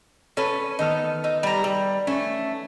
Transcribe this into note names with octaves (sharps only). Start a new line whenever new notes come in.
C#4 A4 B4
D#3 B3 D#4 A4 F6
D#4 E6
G3 A#5
G3
A3 C#4